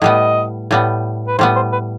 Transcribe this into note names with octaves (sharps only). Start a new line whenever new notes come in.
A2 G3 B3 D#5
A2 G3 B3
B4
A2 G3 B3 C5
C5
B4